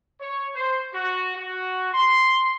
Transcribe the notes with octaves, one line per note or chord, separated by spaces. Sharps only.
C#5
C5
F#4
F#4
C6